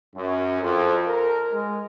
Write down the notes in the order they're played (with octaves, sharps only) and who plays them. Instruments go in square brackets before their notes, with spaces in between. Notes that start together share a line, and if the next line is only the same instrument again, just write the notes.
[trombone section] F#2
F2
A#4
G#3